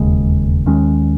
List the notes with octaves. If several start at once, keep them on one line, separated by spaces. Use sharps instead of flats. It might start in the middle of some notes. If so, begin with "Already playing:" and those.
Already playing: E1 D#2 C#3 G#3
D#2 D#3 G#3 C#4